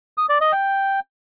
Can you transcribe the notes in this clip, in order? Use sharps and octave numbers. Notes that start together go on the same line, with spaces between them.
D#6
D5
D#5
G5